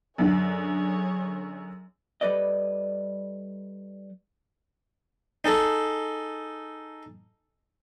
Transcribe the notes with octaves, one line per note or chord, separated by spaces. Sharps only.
F#2 D3 G#4 C#5
G3 A4 B4 D5 D#5
D#4 G#4 A4